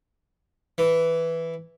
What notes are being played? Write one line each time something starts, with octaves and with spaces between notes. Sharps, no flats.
E3